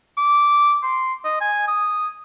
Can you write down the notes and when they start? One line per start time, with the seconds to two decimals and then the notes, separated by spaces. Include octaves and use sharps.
0.17 D6
0.83 C6
1.25 D#5
1.41 G#5
1.68 D#6